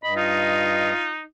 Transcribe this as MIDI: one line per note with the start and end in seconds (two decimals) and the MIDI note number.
0.03 0.92 43
0.03 0.92 75
0.03 0.13 83
0.17 1.22 63
0.17 1.10 65